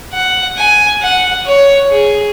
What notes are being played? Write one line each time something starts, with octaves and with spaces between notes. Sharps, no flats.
F#5
G#5
F#5
C#5
G#4